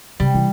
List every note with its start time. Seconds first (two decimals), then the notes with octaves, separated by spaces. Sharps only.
0.20 C3 G3
0.34 E3